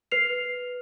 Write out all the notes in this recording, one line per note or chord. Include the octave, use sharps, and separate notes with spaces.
B4 F6 C7 F7